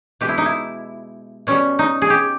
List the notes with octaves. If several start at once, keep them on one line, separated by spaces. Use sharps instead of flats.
B2 G#3 G4
E4
D#4
E4
B2 G3 C#4
D#4
G#4
G4